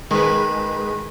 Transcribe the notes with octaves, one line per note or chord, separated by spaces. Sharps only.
D#3 G#3 B4